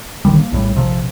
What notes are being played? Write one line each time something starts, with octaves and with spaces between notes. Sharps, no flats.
A#1 D3 D#3 G3
A#3
A#1 A2 G3
A#1 C3 F3